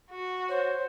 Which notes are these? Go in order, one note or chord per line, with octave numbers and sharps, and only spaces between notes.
F#4
C5 C#5